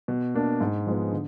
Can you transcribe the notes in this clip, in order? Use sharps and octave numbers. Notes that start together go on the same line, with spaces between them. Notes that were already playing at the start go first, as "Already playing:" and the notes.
B2
A#3 D4
G#2
F3 G#3 B3
D3